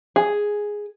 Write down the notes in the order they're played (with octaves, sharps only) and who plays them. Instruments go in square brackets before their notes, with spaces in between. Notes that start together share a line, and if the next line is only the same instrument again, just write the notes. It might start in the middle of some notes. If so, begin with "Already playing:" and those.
[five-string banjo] G#4